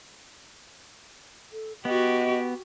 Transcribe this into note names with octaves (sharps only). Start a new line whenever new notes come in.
A4
B3 F#4 G4 D#5